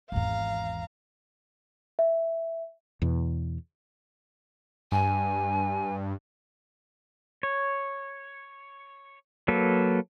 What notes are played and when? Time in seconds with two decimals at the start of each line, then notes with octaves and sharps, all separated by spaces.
0.12 G#1 E2 F5 A#5
1.99 E5
3.02 E2 B2
4.92 G2 G#5
7.43 C#5
9.48 F#3 A#3 A4 B4